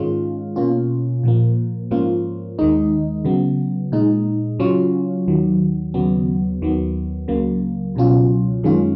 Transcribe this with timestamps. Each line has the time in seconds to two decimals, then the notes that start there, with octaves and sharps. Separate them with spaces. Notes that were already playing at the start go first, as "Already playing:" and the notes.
Already playing: G#2 D#3 G#3 C#4 F4
0.56 B2 A#3 C#4 F4
1.23 A#2 F3 A#3
1.91 G#2 F3 A#3 C#4 F4
2.59 D#2 D#3 G#3 D#4
3.25 C#3 F#3 B3
3.92 A#2 G#3 D#4
4.59 C#3 F#3 C#4 F4
5.27 D#2 D#3 F#3
5.94 D#2 C#3 F#3 B3
6.62 D#2 D#3 F#3 B3
7.28 C#2 C#3 F#3 A#3
7.95 C#2 B2 F#3 C#4 F4
8.63 F#2 D#3 G#3 C#4 F4